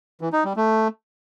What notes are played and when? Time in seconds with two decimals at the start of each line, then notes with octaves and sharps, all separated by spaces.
0.21 E3
0.33 D#4
0.45 G3
0.56 A3